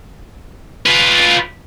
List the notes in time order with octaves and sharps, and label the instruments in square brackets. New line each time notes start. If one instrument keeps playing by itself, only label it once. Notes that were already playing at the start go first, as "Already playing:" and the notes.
[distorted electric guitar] F4 B4